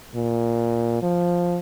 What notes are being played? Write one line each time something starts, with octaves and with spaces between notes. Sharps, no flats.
A#2
F3